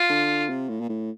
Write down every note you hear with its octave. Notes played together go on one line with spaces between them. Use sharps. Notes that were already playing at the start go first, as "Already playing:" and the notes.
Already playing: F4
D3
C3
A2
A#2
A2